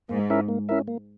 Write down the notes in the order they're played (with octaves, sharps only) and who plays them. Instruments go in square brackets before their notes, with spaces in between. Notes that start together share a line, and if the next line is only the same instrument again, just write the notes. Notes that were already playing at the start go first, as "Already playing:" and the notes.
[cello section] G#2 [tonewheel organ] A#3
[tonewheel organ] C#4 E4 A#4 E5
A#3
C#4 E4 A#4 E5
A#3